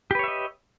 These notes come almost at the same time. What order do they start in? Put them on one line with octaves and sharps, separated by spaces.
G4 B4 C#5 E5 D#5